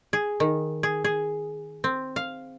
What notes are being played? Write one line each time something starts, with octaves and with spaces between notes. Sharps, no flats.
G#4
D#3
G#4
G#4
C4
F5